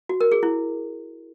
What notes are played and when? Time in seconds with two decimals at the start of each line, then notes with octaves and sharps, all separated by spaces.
0.09 F#4
0.21 A#4
0.32 G#4
0.43 E4